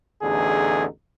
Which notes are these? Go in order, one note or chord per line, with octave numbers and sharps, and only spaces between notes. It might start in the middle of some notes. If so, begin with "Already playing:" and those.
A1 E2 D3 D#4 G#4